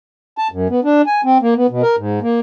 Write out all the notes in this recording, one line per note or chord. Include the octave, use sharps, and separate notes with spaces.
A5
F#2
B3
D4
G#5
C4
A#3
B3
B2
A#4
G#2
A#3